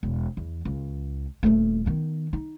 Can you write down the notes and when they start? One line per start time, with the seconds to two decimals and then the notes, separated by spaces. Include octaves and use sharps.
0.03 E1
0.37 E2
0.65 C#2
1.43 D#1 A3
1.86 D#3 B3
2.33 D#4